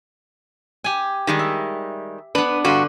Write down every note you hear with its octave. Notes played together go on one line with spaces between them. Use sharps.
G4 G#5
D#3 G3 G#3
E5
B3 D4 B4
G2 D3 F#4 B4 C6